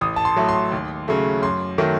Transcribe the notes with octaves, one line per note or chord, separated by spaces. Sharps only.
A1 D#6
A5
C6
A2 F#3 A3
C6
D#2
C#3 F#3 A3
F#2 C6
D#3 F#3 A3